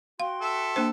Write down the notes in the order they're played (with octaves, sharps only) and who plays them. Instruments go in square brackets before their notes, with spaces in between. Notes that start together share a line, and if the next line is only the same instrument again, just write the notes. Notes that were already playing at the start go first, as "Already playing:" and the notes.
[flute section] F#4 G5 C6 [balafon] F5
[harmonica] A4 E5
[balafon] A#3 D4 C5